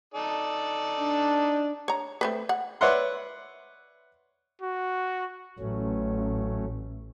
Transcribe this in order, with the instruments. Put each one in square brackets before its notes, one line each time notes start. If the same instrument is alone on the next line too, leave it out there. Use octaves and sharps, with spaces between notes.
[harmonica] D#4 A4 D5
[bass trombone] D4
[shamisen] C#5 A#5
A3 C4 B4
F#5
[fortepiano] B4 C#5 D5 E5 F#5 C6
[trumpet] F#4
[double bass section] A1 [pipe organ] F#3 A3 C#4